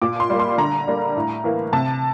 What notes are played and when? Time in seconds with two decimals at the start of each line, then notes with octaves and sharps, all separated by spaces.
0.02 A#2 D6
0.20 C6
0.30 G3 A#3
0.39 C6
0.58 D3 A#5
0.88 G3 A#3
1.16 A2
1.44 E3 A#3
1.73 C3 A5